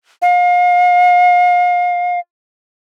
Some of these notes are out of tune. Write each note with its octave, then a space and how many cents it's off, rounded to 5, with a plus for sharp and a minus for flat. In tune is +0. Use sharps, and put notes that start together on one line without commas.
F5 +35